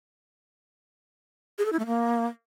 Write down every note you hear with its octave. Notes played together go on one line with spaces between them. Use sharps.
G#4
A4
E4
A3
A#3